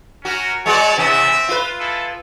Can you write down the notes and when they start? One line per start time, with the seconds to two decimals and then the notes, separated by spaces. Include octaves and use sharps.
0.25 C#4 F#4 A#4
0.66 G#3 B3 F#4 C#5 D5
0.97 C3 E3 B3 C4 E5
1.49 F4 B4
1.80 E4 G#4 A4